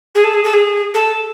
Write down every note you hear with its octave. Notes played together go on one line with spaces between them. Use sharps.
G#4
A4
G#4
A4
G#4
A4